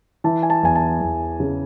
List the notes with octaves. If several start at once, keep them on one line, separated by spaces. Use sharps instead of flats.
E3 A5
G#5
A5
E2 G#5
A5
E2
C#3